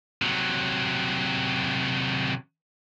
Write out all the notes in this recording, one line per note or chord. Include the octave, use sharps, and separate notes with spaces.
C3 F#3